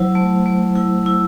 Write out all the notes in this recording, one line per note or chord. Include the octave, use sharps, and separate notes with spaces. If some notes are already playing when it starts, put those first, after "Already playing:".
Already playing: F#3 E4 C5
A3
A3
E4
E4